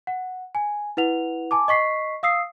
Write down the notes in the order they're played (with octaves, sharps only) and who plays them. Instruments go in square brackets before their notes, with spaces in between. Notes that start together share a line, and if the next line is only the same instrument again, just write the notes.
[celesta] F#5
G#5
E4 B4 F#5 F7
G#5 A5 D6
D#5 C#6 B6 C7
F5 D#6 E6 C7